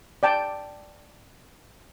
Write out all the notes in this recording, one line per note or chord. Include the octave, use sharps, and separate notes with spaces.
D5 G5 A5